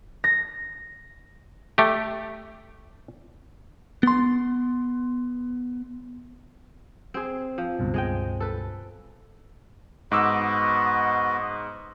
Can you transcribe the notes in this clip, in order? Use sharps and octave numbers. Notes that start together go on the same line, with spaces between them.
A#6
A3 G4
B3 C6
C4 G#4
F3
C#2 G2 B2
G#3 D#5 G5
A4 B4
G#2 B3 F#4 D#5 D6 E6